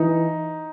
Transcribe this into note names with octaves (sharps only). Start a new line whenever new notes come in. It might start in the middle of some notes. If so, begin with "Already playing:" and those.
Already playing: E3 D#4